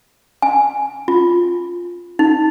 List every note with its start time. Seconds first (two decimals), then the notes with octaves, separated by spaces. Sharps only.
0.42 G#5
1.08 F4
2.19 D#4